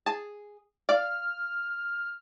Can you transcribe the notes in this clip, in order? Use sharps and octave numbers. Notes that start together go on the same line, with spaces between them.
G#4 A5
D5 F5 F6